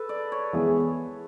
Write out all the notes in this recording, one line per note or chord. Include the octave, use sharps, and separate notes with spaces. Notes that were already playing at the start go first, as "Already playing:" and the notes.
Already playing: A4 B4
D5
C#5
E3 G#3 B3 E4 G#4